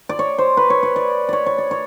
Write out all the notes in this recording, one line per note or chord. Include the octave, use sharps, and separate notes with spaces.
D5
C#5
C5
B4
C#5
C#5
D5
C#5 D5
C#5
D5
C#5